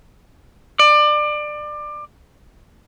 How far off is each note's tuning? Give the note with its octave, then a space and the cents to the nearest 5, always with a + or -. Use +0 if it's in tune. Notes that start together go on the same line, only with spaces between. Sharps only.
D5 +25